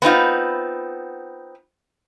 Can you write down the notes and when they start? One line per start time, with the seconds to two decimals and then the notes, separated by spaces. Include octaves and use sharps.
0.02 B3 C4 D#4 F4